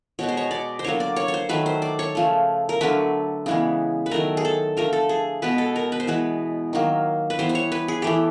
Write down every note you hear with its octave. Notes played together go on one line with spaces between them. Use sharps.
B2 G#3 B3 C#5
C5
C#5
D5
C5
D3 F#3 A#3 C#5
D5
C#5
C#5
C5
D#3 F#3 A3 B4
C5
D5
C#5
C#3 F3 A3
A#4
D3 F#3 A3 B4
C#3 E3 G#3 B3
B4
D#3 F#3 A3 A#4
G#4
A4
D3 F3 A3 A#4
A4
G#4
B2 G#3 B3 B4
A4
A#4
B4
C5
E3 G#3 B3 B4
D#3 F#3 A#3
B4
E3 G3 B3 C5
C5
C#5
B4
G#4
E3 A3 G4